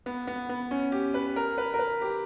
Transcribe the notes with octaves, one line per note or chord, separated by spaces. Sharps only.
B3
B3
B3
C#4
G4
B4
A#4
B4
A#4
B4
G4